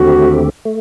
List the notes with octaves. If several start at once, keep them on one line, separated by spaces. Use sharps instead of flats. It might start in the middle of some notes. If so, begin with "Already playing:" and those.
Already playing: D#2 D3 A3 C4 F#4 G4
A3